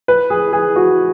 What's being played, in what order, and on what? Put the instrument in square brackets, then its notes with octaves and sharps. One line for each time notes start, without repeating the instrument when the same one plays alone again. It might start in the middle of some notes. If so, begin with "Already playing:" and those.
[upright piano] B4
G#4
G#4
F#4